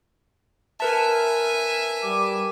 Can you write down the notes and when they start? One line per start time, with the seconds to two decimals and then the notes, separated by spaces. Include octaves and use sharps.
0.80 A#4 B4 E5 G#5 A5
2.03 G3 D6